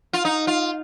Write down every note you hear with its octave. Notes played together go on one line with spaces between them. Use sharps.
F4
D#4
F4